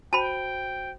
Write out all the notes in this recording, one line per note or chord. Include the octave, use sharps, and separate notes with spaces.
F#4 C5 G5 A5 B5